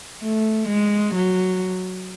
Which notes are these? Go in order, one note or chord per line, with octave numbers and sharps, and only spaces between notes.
A3
G#3
F#3